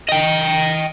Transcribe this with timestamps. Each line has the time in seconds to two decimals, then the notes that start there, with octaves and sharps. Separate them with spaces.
0.09 D#5 G5